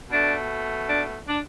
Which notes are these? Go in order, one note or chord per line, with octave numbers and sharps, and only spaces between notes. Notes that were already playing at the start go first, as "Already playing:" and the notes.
B2 A3 D4
D4
D4